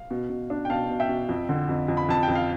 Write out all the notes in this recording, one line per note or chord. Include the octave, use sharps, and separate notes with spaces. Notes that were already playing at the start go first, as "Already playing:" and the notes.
Already playing: F5
B2
B2
D4
G5
B2 F5 A5
B2
E5 G5
B2
F2
D3
F2
F2
B5
F2 A5
G5
F2
F5